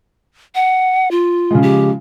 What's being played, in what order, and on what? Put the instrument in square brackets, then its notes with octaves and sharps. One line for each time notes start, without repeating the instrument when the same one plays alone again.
[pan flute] F#5
F4
[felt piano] C#3 F3 G#3
[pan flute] G4